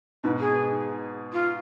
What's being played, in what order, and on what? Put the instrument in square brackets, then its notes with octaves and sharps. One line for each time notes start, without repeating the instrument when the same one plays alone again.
[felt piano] G#2 B2 [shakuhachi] B4
[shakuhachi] G#4
F4